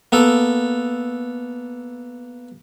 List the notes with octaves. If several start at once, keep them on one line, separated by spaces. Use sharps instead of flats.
A#3 B3 A4